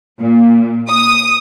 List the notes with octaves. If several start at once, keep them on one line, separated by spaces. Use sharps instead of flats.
A#2
D#6